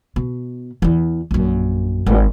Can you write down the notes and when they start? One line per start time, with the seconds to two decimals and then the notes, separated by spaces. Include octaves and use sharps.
0.16 B2
0.82 E2 E3
1.31 A#1 F#2
2.06 G#1